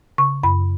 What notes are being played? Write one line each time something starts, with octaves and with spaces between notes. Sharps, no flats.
C#3 C#6
F#2 B5